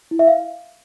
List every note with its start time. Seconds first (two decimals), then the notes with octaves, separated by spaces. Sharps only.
0.11 E4
0.19 E5
0.27 F5